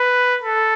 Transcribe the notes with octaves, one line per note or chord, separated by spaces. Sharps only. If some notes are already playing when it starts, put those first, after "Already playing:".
Already playing: B4
A4